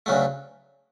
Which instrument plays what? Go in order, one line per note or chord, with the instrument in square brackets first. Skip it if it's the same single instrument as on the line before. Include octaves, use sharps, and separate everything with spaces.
[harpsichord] D2 C#3 F#3 A3